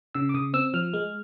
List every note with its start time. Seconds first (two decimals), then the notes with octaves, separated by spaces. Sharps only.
0.15 C#3 E6
0.29 D6
0.34 C#3 D#6
0.54 C4 E6
0.74 F3 F6
0.94 G#3